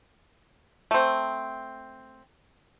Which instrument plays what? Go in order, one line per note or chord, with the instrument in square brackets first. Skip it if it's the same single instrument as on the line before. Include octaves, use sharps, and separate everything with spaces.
[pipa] A3 C4